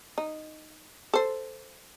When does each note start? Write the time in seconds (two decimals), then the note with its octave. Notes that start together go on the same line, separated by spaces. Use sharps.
0.18 D#4
1.13 A4 C5